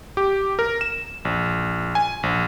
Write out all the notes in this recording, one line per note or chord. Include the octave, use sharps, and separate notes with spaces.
G4
A#4
E7
A#1
G#5
A#1